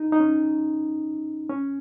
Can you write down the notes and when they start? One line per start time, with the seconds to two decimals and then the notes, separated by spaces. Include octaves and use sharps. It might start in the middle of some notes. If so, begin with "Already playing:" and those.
Already playing: D#4
0.12 D#4
0.20 C#4
1.49 C#4